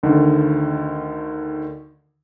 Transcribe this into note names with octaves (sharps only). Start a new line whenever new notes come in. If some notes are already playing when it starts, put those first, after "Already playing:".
D2 D3 D#3